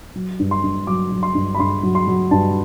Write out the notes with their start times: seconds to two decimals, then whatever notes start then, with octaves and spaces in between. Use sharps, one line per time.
0.15 F#3
0.39 G2
0.51 C6
0.63 G2
0.87 F#3 D6
1.12 F#3
1.23 C6
1.35 G2
1.55 B5
1.59 G2 C6
1.83 F#3
1.95 C6
2.07 F#3
2.31 G2 A5